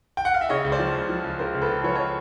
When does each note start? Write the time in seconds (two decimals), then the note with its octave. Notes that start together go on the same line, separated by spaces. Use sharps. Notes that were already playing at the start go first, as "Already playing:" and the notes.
0.17 G5
0.25 F#5
0.34 F5
0.41 E5
0.49 C#3 C#5 D#5
0.64 C#2
0.72 C5 D5
0.79 F3
0.94 C#2
1.09 F3
1.24 C#2
1.39 C#3 A#4 C5
1.55 C#2
1.61 A4 B4
1.69 C#3
1.84 F3 B4 C#5
1.95 C#5 D#5